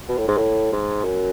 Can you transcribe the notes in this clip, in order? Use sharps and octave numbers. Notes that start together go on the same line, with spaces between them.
B2
A2
G#2
A2
G#2
F#2